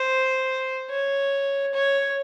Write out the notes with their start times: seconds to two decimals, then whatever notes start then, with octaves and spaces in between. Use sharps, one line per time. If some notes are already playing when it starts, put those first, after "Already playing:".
Already playing: C5
0.91 C#5
1.74 C#5